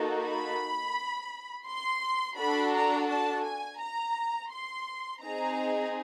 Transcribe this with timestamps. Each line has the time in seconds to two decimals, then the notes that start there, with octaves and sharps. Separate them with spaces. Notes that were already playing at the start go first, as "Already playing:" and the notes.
Already playing: A#3 D#4 F#4 A4
0.24 B5
1.66 C6
2.37 D4 F#4 A4 B5
2.72 A#5
3.09 A5
3.44 G#5
3.79 A#5
4.51 C6
5.21 C4 D#4 G#4 A#5